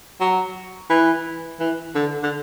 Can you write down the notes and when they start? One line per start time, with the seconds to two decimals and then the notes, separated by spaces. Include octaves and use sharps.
0.21 F#3
0.90 E3
1.60 E3
1.95 D3
2.23 D3